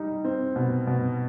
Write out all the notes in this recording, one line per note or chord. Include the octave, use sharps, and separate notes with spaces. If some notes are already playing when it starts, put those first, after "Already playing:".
Already playing: G3 D#4
C4
B2
B2